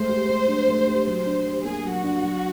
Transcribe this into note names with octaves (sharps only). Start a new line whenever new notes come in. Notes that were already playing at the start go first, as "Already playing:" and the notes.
Already playing: G#3 A3 C5
G4
A3
D4
A3
G4
F#3 C5
D4
G4
A#3 G#4
F#3
F#4
D4
F#3